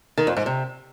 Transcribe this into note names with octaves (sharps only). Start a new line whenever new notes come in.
D#3
F2
G#2
C3